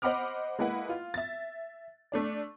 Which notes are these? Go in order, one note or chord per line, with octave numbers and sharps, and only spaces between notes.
C5 D#5 F#5 B5 D6 F6
G#3 A#3 E4 B4 F#5
F4
E5 A6
A3 D4 D5